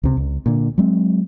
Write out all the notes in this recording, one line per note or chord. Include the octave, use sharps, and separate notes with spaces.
C#2 C3
C#2
A#2 D3
F#3 G#3 C4